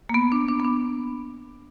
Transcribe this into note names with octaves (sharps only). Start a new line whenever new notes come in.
A#3
B3
D4
D4
B3
D4